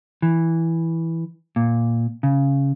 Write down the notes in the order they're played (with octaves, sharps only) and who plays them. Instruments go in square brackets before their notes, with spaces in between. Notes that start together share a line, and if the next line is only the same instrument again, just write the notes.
[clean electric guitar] E3
A#2
C#3